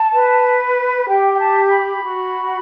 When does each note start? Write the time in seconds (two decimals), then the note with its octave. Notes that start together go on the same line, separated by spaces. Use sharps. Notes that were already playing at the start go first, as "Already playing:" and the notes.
Already playing: A5
0.12 B4
1.08 G4 G5
1.34 G5
1.39 A5
1.70 B5
2.03 F#4